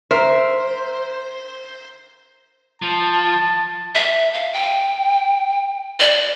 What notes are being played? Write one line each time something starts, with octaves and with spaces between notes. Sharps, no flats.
A#4 C5 E5
F3 A5
E5
F5
G5
D5